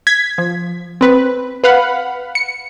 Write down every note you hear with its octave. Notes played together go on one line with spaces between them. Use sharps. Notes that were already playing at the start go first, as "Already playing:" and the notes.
G#6 B6
F3
C4 B4
B4 F5 F#5 B5
C#7